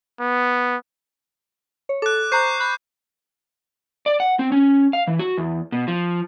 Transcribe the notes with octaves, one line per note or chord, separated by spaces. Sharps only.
B3
C#5
A4 D6 F#6
C5 A#5 C#6 F#6 G6 C7
B5 F#6
D5
F#5
C4
C#4
F5
E3
F#4
E2
B2
F3